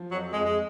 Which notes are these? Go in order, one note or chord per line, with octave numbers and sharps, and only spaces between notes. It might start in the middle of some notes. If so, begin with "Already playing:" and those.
Already playing: F3
F2 F#3
F2 G#3
G#3